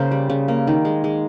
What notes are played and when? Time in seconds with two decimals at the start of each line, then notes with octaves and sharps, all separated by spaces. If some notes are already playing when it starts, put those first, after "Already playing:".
Already playing: C#3 A#3 A#4 C5
0.11 G3
0.30 C#3
0.48 A#3
0.67 D#3
0.85 G#3
1.04 G#3